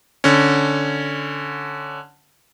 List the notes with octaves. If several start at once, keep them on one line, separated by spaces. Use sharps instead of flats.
D3 C#4